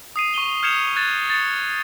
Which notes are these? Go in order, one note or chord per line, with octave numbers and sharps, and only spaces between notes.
D#6 C7 D#7
C#6 D#7 F7 G7
F6 G6 G#6 C#7 E7 F7
F#6 G#6 A6 E7
A6 C#7